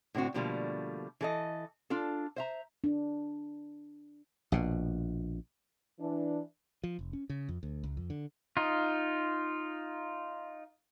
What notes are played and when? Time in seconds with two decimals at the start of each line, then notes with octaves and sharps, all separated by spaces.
0.15 A2 D3 C4 F#4
0.34 B2 D3 F3 G3 A3 A#3
1.21 E3 A4 D#5
1.90 D4 F4 A4
2.36 C5 E5 A#5
2.84 D4
4.52 A#1 B2
5.99 E3 D4
6.84 F3
6.99 F1
7.13 C#4
7.30 C#3
7.49 F2
7.63 D2
7.84 C#2
7.97 F2
8.10 D3
8.57 D#4 F4